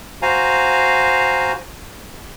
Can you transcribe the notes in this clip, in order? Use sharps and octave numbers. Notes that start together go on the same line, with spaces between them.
F#4 C5 F5 G#5 A#5